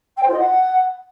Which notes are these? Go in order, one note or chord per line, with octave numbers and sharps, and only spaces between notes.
G5
C5
F4
D#5
F#5